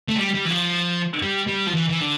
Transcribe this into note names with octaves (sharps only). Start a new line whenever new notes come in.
A3
G3
G3
E3
F3
G3
G3
F3
E3
E3
D3